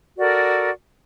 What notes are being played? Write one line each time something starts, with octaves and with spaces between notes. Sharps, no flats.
F#4 A4 A#4 D5